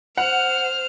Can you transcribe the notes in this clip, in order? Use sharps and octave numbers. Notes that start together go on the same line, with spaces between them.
C5 F#5 F6